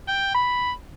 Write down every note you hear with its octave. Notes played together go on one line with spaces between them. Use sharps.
G5
B5